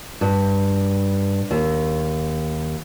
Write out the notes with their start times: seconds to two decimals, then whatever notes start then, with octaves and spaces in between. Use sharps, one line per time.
0.21 G2
1.51 D#2